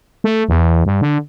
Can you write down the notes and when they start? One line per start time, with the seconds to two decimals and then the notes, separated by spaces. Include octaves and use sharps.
0.24 A3
0.49 E2
0.86 G2
1.01 D3